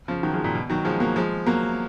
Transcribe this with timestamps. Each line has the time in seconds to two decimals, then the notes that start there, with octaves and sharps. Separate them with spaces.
0.08 C#3 F3
0.23 D#3 F#3
0.34 F3 G#3
0.44 A#2
0.55 B2
0.70 D#3 F#3
0.85 F3 G#3
1.00 F#3 A#3
1.16 F3 G#3
1.46 F#3 A#3